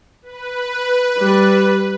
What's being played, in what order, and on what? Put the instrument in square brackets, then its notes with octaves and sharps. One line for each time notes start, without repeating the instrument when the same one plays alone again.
[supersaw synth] B4
[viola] G3